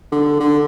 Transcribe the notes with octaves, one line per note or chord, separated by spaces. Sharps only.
D3
D3